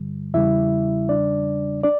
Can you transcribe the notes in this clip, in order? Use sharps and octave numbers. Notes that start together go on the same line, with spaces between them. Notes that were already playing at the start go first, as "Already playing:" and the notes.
Already playing: G2 D3 G3
E2 C#3 G3 E4 E5
D4 D5
D4 D5